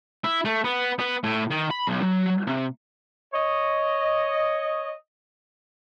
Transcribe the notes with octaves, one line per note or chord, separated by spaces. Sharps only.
E4
A3
B3
B3
A2
D#3
B5
B1
F#3
C3
C#5 D#5